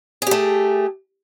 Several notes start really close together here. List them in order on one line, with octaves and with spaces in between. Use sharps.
G#4 G4 A3